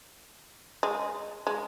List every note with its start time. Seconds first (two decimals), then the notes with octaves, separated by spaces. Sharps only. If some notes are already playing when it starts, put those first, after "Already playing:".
0.83 G#3
1.47 G#3